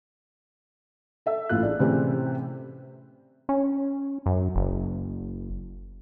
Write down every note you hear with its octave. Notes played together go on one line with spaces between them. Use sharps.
A4 E5 E6
A1 A2 E4 F4 F#6
D4 G#4 D5
A2 C3 E3 C4 C#4 G4
C#4
F#2
F#1